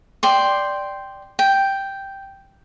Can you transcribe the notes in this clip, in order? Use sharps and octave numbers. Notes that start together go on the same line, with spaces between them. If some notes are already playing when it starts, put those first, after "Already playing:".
D5 G5 C6
G5